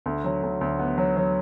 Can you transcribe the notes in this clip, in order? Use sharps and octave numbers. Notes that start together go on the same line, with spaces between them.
D2
F#3
D2
D2
B3
F#3
F#3